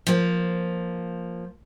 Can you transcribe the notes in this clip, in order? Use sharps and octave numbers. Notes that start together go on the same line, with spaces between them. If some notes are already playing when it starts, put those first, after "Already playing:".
F3 A#3